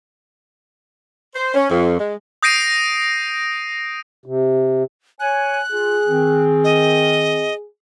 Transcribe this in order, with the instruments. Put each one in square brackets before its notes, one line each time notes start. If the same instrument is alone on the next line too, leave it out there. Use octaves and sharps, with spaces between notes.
[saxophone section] C5
C#4
F2
G#3
[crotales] D#6 G6 A#6 C7 D7 D#7
[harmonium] C3
[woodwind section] C#5 G#5 [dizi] F#6
[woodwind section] F4 [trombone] G#4
[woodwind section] D#3 C4
[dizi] D#5